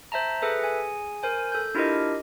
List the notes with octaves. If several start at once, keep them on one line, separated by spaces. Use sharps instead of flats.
C5 E5 A5 A#5
G#4 A4 B4 E5
G#4 G#5
A#4 C5 G#5
A4 G6
D4 E4 F4 G4 A#4 D#5